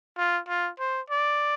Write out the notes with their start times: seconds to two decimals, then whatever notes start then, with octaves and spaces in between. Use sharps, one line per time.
0.18 F4
0.48 F4
0.79 C5
1.10 D5